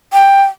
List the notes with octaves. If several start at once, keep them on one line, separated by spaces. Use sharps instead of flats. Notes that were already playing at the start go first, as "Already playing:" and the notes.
G5